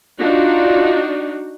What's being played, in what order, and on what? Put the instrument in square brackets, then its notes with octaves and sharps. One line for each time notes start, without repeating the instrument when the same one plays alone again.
[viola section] D4 D#4 F#4 [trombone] F4